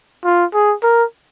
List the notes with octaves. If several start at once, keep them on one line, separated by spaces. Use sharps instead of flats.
F4
G#4
A#4